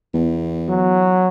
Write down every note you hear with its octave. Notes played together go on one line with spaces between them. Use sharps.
E2
F#3